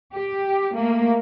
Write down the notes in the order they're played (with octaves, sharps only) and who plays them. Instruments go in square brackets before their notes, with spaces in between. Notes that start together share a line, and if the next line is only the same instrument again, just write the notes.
[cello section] G4
A3 A#3